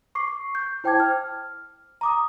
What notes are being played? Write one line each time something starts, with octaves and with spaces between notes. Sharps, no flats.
C#6 D6 C7
G6
E4 C5 G5 A5 D6 G#6
F6
A#5 D6 D#6